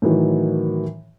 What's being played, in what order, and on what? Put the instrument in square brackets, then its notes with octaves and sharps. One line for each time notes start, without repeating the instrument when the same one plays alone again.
[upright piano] A2 D#3 E3 F#3